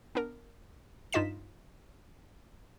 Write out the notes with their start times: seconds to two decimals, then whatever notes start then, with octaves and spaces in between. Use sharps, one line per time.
0.15 B3 D4 A#4
1.13 G2 D#4 F4 D#5 B6 E7